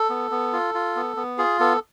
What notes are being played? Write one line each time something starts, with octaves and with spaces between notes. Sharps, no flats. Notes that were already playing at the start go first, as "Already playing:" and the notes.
Already playing: A4
B3
B3
F4
F4
B3
B3
F4 G#4
B3 A4